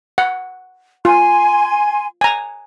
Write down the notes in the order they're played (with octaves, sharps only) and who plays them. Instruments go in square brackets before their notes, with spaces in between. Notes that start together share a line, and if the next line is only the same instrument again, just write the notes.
[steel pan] F#5
[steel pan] F4 [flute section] G#5 C6
[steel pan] G#5 A#5